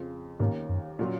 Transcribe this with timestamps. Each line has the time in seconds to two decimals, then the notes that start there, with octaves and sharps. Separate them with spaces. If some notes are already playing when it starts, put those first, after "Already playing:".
Already playing: F2 C#3 F3
0.40 D#2 G#2 D#3 A#3 C#4
0.69 F#2
0.99 A#2 F#3 C#4 F4